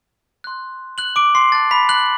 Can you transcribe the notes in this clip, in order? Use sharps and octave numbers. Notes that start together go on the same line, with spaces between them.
C6 F#6
F#6 F#7
D6 D7
C6 C7
A5 C6 F#6 A6
B5 B6
F#6 F#7